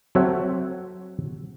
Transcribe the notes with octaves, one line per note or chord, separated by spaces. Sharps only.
F#3 C4 A4 C#5 E5 F#5